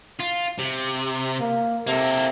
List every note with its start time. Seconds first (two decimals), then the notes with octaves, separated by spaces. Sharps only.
0.20 F4
0.59 C3
1.40 A#3
1.87 C3 A#3 A4